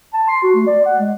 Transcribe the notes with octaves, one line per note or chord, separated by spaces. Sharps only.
A5
C6
F#4
A3
D5
F#5
G#3